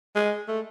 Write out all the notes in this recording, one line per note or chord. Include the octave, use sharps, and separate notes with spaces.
G#3
A3